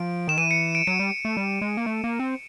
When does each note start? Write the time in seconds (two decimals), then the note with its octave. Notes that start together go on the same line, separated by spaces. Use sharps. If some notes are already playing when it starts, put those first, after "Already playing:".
Already playing: F3 D7
0.27 D#3 E7
0.37 E3 D#7
0.51 C#7
0.75 D7
0.87 F#3 C#7
0.99 G3
1.25 A3
1.37 G3
1.61 G#3
1.77 A#3
1.86 A3
2.04 A#3
2.20 C4